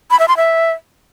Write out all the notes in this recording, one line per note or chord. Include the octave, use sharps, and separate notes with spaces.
B5
E5
C6
E5